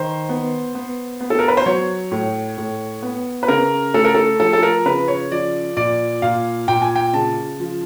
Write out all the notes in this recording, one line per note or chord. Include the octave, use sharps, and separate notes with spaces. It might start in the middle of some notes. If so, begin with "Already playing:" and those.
Already playing: D#3 C5
B3
B3
B3
A4
A#4
B4
C5
F#3 C#5
A2
A2
B3
B4
C#3 A#4
A3 A4
A#4
A4
F3 A4
A4
A#4
C#3 B4
C#5
F3 D5
A#2 D5
A#2 F5
A#2 G5
G#5
G5
C#3 A5
F3